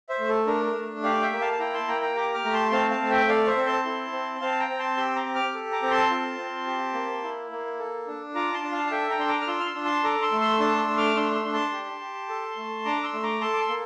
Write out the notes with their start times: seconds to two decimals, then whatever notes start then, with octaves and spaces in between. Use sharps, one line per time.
0.09 C5 E5
0.19 A3
0.29 A4
0.47 D4 A#4
0.66 A#4
0.75 A3
1.03 G4 D5 F5
1.22 E5 G5
1.31 A#3
1.41 F5 A5
1.53 A5
1.59 E4 G5 A#5
1.74 A5 C6
1.88 A#3 G5 A#5
2.01 G5 A#5
2.16 G4 A#5 D6
2.34 D6 F6
2.45 A3 A#5
2.53 A5 C6
2.72 C4 F5 A5
2.91 F5 A5
3.01 A3
3.10 E5 G5
3.29 A4 D5 F5
3.47 C5 E5
3.56 C4
3.66 A5 C6
3.85 E4
4.12 C4
4.41 C4 F5 A5
4.59 G5 A#5
4.70 C4
4.79 A5 C6
4.97 G4 C6 E6
5.16 A#5 D6
5.25 G4
5.35 D6 F6
5.54 A4
5.72 A#5 D6
5.82 C4
5.91 A5 C6
6.10 F4
6.39 C4
6.66 G4
6.94 A#3
7.23 E4
7.51 A#3
7.79 A4
8.07 D4
8.35 F4 A#5 D6
8.54 A5 C6
8.64 D4
8.72 F5 A5
8.87 A5
8.91 A4 E5 G5
9.10 G5 A#5
9.19 D4 C6
9.29 A#5 D6
9.42 F6
9.47 F4 C6 E6
9.60 F6
9.66 C6 E6
9.75 D4
9.85 A5 C6
10.04 A4 A#5 D6
10.22 C6 E6
10.32 A3
10.41 C6 E6
10.60 D4 A5 C6
10.78 C6 E6
10.88 A3
10.97 D6 F6
11.16 D4 C6 E6
11.35 C6 E6
11.45 D4
11.53 A5 C6
11.72 G4
12.01 G4
12.29 A4
12.56 A3
12.85 D4 A#5 D6
13.03 C6 E6
13.13 A3
13.23 A#5 D6
13.41 A4 A5 C6
13.53 D6
13.60 C6 E6
13.69 A#3